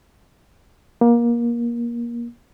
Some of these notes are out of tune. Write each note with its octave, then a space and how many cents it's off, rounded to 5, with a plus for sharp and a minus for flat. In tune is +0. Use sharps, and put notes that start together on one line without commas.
A#3 +25